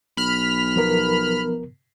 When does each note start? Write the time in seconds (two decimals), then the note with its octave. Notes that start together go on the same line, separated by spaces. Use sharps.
0.17 B1 B5 F6
0.76 F3 B3 A#4